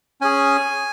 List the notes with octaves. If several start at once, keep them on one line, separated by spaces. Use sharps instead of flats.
C#4 G#4 G#5